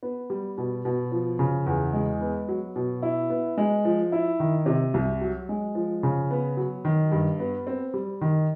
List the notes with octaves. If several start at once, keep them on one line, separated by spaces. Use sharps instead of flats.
B3
G3
B2
B2
F3
C#3
E2
G#3
B3
F#3
B2
E4
B3
G#3
F3
E4
D#3
C3
C2
F#3
G#3
F3
C#3
B3
F#3
D#3
G2
B3
C4
G3
D#3